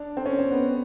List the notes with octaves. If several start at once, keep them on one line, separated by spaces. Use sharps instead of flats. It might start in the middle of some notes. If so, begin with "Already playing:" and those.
Already playing: D4
C4
C#4
C4
B3